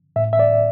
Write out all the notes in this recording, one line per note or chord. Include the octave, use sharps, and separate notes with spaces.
A2 E5
E5
D5